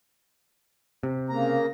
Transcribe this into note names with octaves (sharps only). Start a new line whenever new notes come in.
C3
C#3 A#3 A#5